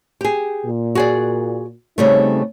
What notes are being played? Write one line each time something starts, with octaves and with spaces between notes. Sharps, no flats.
G4 G#4
A#2
F#4 G#4 D5
C#3 G3 A3 C4 D#4 C#5